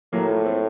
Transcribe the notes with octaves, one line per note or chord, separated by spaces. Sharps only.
A2 F#3 A#3
F3 A3
A3 C4